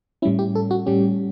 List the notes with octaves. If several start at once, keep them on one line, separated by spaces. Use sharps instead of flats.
A2 G3 C#4 E4
G4
A4
F#4
A2 G3 C#4 G4